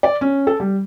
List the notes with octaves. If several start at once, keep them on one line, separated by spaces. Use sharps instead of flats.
D5
C#4
A4
G3